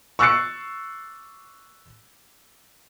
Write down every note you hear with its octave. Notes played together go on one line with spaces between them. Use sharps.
C#6 E6 F#6 A6 C7 C#7